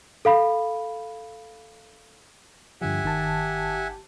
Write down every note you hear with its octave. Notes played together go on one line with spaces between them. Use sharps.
A4 F5 B5
G2 D3 F3 G4 E5 F#5 G#5
G1 D#3 A5